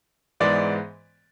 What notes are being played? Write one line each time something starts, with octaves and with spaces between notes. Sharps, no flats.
G#2 E3 G#3 B3 D5